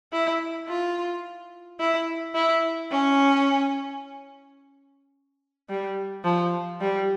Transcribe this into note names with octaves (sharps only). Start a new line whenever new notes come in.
E4
F4
E4
E4
C#4
G3
F3
G3